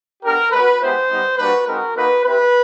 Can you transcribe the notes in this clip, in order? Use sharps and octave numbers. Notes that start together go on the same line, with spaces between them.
B3 D4 G4 A#4
G#3 C#4 F#4 B4
G#3 B3 E4 G4 C5
G3 B3 D#4
G3 A#3 D4 F#4 B4
G#3 C4 D#4 F#4 A#4
A#3 D#4 F#4 B4
C4 E4 G4 B4